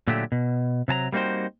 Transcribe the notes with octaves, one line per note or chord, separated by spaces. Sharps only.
A#2 D3 F#3 A3 G4
B2
C3 F#3 A5 A#5
G3 A#3 C4 D#4 F#4 C5